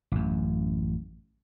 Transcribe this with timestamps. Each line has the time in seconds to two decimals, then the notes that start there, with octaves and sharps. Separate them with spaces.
0.12 A1 F#2